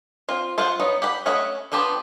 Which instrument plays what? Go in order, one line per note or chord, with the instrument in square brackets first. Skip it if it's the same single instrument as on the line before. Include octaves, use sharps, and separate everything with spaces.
[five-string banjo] C4 F4
F4 C5 F5 F#5
B3 D#4 C#5
G4 F#5 B5
A3 C#4 D#5 F#5 B5
F3 B3 D4 G4 C5